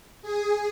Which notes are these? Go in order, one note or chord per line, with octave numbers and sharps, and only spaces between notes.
G#4